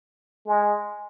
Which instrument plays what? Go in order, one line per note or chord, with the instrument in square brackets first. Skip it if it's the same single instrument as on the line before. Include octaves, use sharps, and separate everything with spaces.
[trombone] G#3